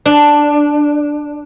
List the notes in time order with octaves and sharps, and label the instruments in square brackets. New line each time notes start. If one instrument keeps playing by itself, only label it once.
[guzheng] D4